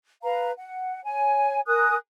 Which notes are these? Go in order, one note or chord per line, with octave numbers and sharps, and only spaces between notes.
B4 F5 A#5
F#5
C#5 G#5
A#4 G#5 D#6 F#6